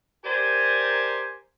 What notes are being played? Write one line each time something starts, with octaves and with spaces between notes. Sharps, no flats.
G4 A#4 C5 D5 G#5